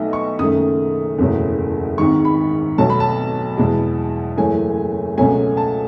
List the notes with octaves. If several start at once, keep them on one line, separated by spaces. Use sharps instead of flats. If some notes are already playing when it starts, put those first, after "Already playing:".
Already playing: B1 B2 A3 D#4 D#5 E5
C#6
F#1 F#2 D#3 A3 D#6
F#1 E2 B2 F#3 A3
G#1 G#2 D#3 C#6
B5
B1 B2 F#3 A3 A5
B5
A5
E2 B2 G#3
F#1 F#2 E3 A3 C#4 G#5
C#2 B2 F#3 A3 G#5
A5